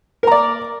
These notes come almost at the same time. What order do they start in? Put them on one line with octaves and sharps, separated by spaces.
A#4 A#5 D5